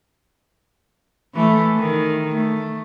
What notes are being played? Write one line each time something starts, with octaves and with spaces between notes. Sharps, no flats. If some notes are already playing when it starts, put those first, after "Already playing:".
E3 A3
D#3
A3